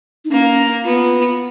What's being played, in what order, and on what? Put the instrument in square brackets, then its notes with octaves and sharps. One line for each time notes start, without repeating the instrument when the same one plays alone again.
[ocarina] D#4
[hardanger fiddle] A#3 [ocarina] C#4
[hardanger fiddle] B3 [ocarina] F4